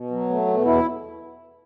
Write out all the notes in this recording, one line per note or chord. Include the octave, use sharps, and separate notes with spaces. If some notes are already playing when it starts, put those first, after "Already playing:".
Already playing: B2
F#3
A3
B2
E2 E4